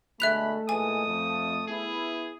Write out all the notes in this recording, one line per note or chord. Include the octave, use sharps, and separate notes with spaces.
B2 D3 G#3 A3 E5 B5 F#6 F7
A#2 E3 G#3 G#5 D#6
F2
B3 E4 G#4